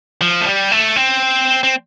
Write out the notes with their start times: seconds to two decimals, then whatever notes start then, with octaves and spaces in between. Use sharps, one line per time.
0.21 F3
0.41 A3
0.46 G3
0.72 A3
0.96 C4
1.63 C4